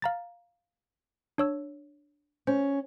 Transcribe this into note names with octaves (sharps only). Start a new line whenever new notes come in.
F5 A#5 A6
D4 C#5 E6
C#4 C5